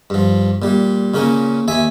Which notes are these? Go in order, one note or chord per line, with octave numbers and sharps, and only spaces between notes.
G2 F3
A#2 G3
A#2 C#3 C#4 A#4
D#2 E5 G#5